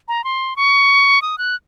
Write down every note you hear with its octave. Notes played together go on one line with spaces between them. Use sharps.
A#5
C6
C#6
D#6
F#6